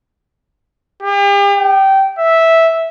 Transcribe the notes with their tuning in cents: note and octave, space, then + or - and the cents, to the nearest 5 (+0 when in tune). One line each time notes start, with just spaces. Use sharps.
G4 +40
G5 -20
E5 -10